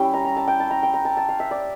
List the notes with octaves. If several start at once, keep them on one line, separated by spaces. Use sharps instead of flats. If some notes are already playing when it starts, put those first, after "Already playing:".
Already playing: G3 C#4 E4 G5
A#5
A#5
A5
G5
A5
A#5
G5
A#5
A5
A5
F5
E5
D5